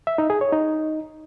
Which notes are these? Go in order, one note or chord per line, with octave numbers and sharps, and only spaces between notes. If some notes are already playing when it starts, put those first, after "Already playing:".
E5
D#4
G#4
C#5
D#4